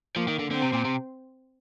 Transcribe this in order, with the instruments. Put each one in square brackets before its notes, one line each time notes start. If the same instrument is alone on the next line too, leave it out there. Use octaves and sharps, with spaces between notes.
[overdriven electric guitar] F3 [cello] A#3
[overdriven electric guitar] D#3
D3
[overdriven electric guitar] D3 [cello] C4
[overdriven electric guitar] C3
A#2
C3